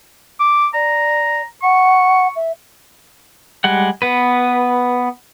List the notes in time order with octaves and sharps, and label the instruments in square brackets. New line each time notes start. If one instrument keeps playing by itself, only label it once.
[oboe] D6
[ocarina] D5 [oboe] A#5
[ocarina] F#5 [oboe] C#6
[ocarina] E5
[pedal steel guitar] G3 G#3 F#5
B3 B4